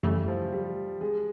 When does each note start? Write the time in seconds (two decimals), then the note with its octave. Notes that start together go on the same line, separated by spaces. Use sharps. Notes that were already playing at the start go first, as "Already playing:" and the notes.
0.03 F#2 C#3 E3 G3 A3
0.28 F3
0.52 G3
1.01 G#3